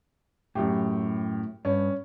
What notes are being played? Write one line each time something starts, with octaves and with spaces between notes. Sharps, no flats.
F#2 A2 G4
G2 C#4